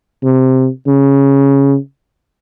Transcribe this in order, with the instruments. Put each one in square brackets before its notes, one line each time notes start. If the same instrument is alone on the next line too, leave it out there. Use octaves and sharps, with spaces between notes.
[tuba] C3
C#3